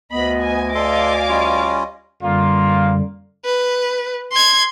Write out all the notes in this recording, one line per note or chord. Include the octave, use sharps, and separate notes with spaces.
D2 B3 D#5 B5
G#5
A4 D5 F5 G#5 C6 D6
G3 C#4 F4
F#2 D3 G3 A#3 F4
B4
C6 G#6